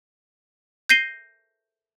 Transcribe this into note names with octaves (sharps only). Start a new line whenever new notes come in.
G6 A#6 C7 D#7 G7